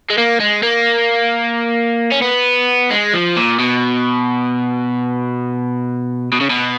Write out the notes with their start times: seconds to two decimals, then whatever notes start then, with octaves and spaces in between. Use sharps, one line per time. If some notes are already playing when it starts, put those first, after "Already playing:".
0.10 G#3
0.18 A#3
0.40 G#3
0.63 A#3
2.12 C#4
2.22 B3
2.91 G#3
3.14 F3
3.37 A#2
3.59 B2
6.32 B2
6.41 C#3
6.50 B2